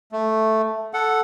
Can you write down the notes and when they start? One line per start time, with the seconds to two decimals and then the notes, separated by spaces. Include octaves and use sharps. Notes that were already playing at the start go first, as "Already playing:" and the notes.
0.12 A3
0.94 A4 F#5